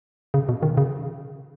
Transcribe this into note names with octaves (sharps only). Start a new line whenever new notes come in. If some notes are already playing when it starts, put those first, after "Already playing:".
C#3
B2
D#3
C#3